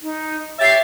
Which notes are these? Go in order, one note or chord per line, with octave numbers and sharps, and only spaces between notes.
D#4
G4 C#5 E5 A6 C7